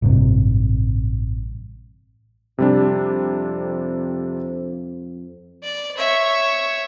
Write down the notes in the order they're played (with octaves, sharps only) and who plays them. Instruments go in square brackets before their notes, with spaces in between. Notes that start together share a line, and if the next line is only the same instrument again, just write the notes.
[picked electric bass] A1 G2 C3
[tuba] F2 [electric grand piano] C3 G3 D4
[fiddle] D5
C#5 E5